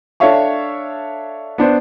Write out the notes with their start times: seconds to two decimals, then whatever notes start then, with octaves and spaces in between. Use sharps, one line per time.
0.20 D4 A4 C#5 E5 F5 C#6
1.58 B3 D4 C5